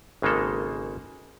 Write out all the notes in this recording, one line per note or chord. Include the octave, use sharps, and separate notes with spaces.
G#1 C#3 G#3 A#3 A4